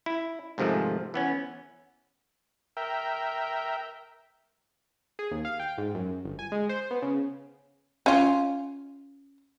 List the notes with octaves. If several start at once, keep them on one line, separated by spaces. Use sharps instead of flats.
E4
G#2 C3 D#3 F3 A3 G#4
E3 B3 C#4
A#4 E5 G5
G#4
D#2
F5
G5
G#2
F#2
G1
G#5
G#3
C5
B3
C#3
C#4 F4